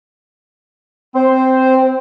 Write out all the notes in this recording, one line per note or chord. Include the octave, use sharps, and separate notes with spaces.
C4 C5